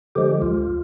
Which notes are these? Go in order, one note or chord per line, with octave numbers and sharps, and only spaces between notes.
D3 F3 G#3 G4
D2 F4